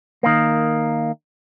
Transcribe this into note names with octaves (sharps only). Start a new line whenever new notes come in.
D#3 A#3